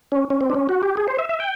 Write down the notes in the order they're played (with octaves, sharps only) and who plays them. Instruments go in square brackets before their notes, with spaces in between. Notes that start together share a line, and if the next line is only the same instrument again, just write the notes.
[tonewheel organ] C#4
C#4
C4
D4
C#4
F#4
G4
G#4
C5
E5
E5
G5